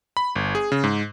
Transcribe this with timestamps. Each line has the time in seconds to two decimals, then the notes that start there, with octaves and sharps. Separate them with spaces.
0.17 B5
0.36 G1
0.55 G#4
0.72 C#3
0.84 G#2